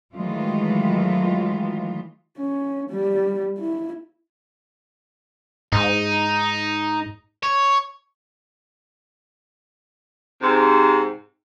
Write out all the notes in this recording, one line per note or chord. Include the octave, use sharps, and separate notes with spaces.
D#3 E3 F#3 G#3 A3 F4
C#4
G3
E4
G#2 D#4
C#5
G#2 C3